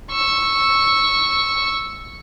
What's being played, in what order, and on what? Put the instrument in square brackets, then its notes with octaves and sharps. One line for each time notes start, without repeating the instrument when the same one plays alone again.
[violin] C#6 E6